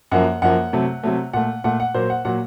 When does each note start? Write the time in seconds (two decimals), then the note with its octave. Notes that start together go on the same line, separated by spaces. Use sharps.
0.11 F#2 F3 A#3 F#5
0.42 F#2 F3 A#3 F#5
0.73 C3 F#3 A3
1.04 C3 F#3 A3
1.33 A#2 A3 F#5
1.64 A#2 A3 F#5
1.80 F#5
1.94 A#2 F#3 A#3 C5
2.10 F#5
2.25 A#2 F#3 A#3 F#5